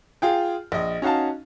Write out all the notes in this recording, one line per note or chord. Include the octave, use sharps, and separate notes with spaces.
F4 G#4 G5
A#1 D#5
C#4 D#4 F#4 F5 A5